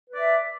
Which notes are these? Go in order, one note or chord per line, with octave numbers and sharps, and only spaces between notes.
B4 D5 E5